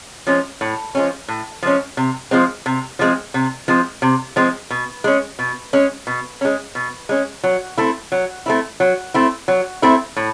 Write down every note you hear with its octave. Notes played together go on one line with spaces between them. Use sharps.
F3 G#3 C#4
A2
F3 G#3 C#4
A2
F3 G#3 C#4
C3
F3 G#3 C4
C3
F3 G#3 C4
C3
F3 G#3 C4
C3
F3 G#3 C4
B2
G#3 C#4
B2
G#3 C#4
B2
G#3 C#4
B2
G#3 C#4
F#3
A3 C4 E4
F#3
A3 C4 E4
F#3
A3 C4 E4
F#3
A3 C4 E4
A2